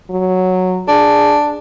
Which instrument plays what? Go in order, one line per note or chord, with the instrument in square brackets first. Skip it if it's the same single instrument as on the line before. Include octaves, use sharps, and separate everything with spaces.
[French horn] F#3
[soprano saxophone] D4 [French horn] G#4